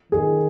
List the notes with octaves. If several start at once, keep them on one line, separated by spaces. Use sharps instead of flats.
D#3 G#4